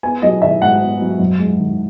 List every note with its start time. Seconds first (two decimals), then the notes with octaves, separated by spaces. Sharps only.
0.03 B3 G#5
0.22 F#3 D#5
0.42 D#3 E5
0.62 G#2 F#5
0.81 B3
1.01 F#3
1.19 F#2
1.39 G#3
1.59 D#3